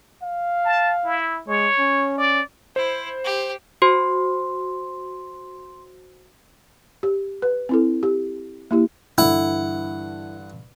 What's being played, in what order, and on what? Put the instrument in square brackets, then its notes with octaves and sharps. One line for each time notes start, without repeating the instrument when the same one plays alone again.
[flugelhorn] F5
[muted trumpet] A5
E4
[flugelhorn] G#3 [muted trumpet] C#5
[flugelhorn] C#4
[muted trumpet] D5
[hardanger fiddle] E4 [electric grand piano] C5
[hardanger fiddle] G4
[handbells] F#4 C5 [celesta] C6
[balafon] G4
B4
C4 E4 A4
G4
A#3 E4 G4
[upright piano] G2 D3 E3 [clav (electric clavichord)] E4 [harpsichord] F#5